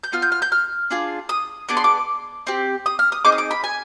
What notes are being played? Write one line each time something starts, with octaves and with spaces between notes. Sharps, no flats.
G6
B3 F4 F6
G6
F6
G6
F6
D4 F4 G#4
D#6
B3 D4 G#4 D6
C6
D6
C4 G4
D#6
F6
D#6
C4 D#4 G#4 D6
D#6
D6
B5
G#5